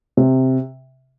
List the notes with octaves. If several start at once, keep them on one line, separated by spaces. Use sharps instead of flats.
C3